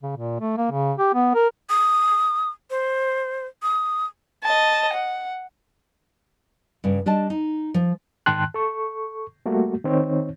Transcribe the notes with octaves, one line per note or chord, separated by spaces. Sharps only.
C#3
A#2
A3
A#3
C#3
G4
B3
A#4
D#6
C5
D#6
D#5 A5
F#5
G2 C#3
G3 D4 D#5 A5
D#4
F3
G#2 D#3 G5 A5 C6 F#6
A4 C#6
G3 A3 A#3 F#4
D#3 C4 D#4 C#5